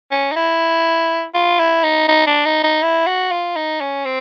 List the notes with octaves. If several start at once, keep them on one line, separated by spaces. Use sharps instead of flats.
C#4
D#4
E4
F4
E4
D#4
D#4
D4
D#4
D#4
E4
F#4
F4
D#4
C#4
C4